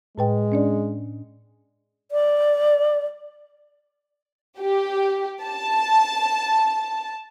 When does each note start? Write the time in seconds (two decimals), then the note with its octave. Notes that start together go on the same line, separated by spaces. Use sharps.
0.18 A2 G#3 B4 G5
0.52 C#4 D4 D5
2.11 D5
4.59 G4
5.43 A5